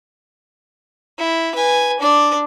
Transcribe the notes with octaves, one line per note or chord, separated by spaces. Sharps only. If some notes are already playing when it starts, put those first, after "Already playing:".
E4
B4 G#5
D4 D5